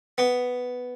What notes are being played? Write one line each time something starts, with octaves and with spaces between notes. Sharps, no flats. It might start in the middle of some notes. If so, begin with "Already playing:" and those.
B3